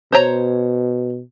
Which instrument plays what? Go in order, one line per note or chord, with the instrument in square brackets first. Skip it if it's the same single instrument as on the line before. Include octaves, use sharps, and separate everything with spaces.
[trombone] B2 [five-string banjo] C5 C#5 A#5